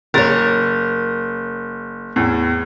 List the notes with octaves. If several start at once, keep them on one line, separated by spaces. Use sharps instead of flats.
F#1 A#4 C#5 A6
E2 A2